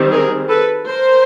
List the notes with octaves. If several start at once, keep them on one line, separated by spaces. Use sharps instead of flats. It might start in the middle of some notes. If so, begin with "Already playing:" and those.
Already playing: D#3 G3 C4
G#4 A#4
A4 B4
A#4 C5